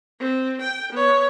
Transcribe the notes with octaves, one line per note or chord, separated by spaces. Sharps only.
C4
G5
B3 C#5